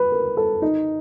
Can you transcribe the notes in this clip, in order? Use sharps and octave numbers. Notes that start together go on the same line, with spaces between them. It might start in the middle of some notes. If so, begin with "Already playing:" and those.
Already playing: B4
A#4
A4
D#4